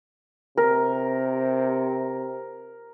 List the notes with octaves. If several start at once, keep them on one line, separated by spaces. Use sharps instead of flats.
C3 A#4